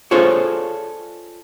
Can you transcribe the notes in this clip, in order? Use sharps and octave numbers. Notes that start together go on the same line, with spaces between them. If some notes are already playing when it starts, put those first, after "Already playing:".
D4 F4 G#4 A4 C5 C#5